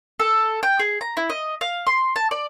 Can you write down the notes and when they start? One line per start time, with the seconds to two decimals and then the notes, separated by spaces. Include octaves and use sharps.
0.19 A4
0.63 G5
0.79 G#4
1.01 A#5
1.17 E4
1.30 D#5
1.61 F5
1.87 C6
2.16 A5
2.31 D5